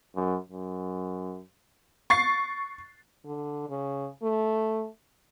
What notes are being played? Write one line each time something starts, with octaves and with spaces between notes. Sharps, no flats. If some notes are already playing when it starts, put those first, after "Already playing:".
F#2
F#2
C#6 A6 C7
D3
C#3
A3